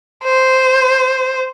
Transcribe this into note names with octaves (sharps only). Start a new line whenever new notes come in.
C5